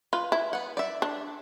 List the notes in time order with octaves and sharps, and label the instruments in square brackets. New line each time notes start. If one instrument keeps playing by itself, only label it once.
[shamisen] F4 [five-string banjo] B4
[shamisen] E4
[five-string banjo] B3 F#5
D5 E5
[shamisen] D4